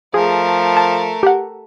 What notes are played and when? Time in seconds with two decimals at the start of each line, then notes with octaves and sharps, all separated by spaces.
0.14 F3 A3 G#4 A#4
0.77 A5
1.23 G4 F#5